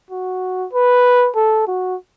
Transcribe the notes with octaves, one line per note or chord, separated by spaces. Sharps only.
F#4
B4
A4
F#4